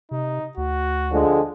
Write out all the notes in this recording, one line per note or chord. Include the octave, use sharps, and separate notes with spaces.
C3 D#4
D2 F#4
D3 F3 G#3